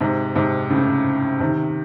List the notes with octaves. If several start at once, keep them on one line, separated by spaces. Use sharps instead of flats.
G#2 C3
G#2 C3
A2 C#3
C3 D#3